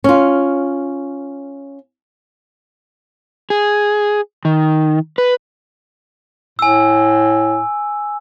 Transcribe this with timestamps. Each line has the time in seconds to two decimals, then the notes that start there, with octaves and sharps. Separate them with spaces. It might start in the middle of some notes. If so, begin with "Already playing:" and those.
0.04 C#4 F4
3.50 G#4
4.45 D#3
5.18 B4
6.59 A2 G#5 E6